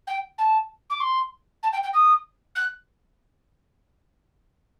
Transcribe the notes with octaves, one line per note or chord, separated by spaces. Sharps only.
G5
A5
D6
C6
A5
G5
G5
D#6
F#6